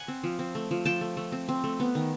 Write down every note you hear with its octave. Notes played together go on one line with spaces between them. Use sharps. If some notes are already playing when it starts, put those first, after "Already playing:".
Already playing: F#5 G#5
C4
F3
C4
A3
F3
F3 G5 A5
A3
A3
C4
C4
A3
B3
D#3